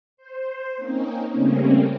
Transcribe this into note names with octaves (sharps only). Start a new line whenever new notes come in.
C5
A#3 C4 C#4 D#4
C#3 G3 A3 A#3 C4 C#4